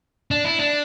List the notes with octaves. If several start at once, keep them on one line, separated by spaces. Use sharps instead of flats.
D4
E4
D4